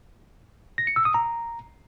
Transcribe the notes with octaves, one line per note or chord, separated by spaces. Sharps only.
A#6
C#7
E6
D#6
A#5